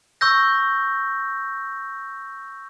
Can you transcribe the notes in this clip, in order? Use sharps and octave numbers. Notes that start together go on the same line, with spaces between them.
C#6 E6 G6 A#6